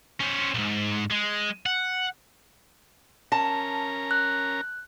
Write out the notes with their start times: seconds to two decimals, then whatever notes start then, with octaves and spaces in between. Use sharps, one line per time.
0.20 C#4 C5
0.55 B1 G#2
1.10 G#3
1.66 F#5
3.32 C#4 A#4 A5 A#5
4.11 F#6